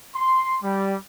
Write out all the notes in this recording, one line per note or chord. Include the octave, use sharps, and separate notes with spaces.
C6
G3